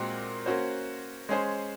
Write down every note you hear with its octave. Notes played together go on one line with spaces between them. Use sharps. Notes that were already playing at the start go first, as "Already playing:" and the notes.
Already playing: A#2 G#3 C4 F#4
A#3 C#4 F#4 C5
G#3 C#4 G#4 C5